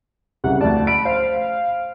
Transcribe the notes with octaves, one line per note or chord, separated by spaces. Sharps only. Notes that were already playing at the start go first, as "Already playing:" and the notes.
C2 C#3 F#5
D2 D5 A5
B5 D7
C5 F5